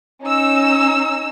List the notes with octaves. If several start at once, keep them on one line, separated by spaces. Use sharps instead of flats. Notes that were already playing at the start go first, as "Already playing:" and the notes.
C#4 D#4 E6